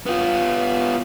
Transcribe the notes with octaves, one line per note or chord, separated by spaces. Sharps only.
B3 F4